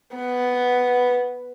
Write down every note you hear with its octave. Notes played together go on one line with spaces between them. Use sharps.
B3